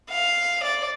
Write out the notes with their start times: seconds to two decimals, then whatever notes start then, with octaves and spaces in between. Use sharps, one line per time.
0.10 F5
0.63 D5